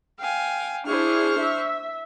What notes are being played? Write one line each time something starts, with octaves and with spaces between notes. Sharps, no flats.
F5 G5 G#5
D4 E4 G#4 C5 C#6 F6
E5